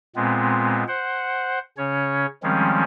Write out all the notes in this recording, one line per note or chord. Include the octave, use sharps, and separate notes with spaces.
A#2 G#3 B3 C4
C5 F#5
C#3 C#4 C#5
D#3 F3 G3 G#3 C4 C#4